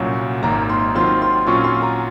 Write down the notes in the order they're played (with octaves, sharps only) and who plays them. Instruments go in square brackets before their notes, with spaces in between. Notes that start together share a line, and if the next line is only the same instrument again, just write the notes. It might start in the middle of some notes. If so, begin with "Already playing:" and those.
Already playing: [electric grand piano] C2 A#2 F#3 C#4 F#4
[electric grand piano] G#1 F#2 D#3 A#3 [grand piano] A#5
[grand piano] C6
[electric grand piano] D#3 F#3 C4 F4 [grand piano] C6
[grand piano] C6
[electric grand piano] A#2 F#3 C#4 F4 [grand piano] C#6
[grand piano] C6
A#5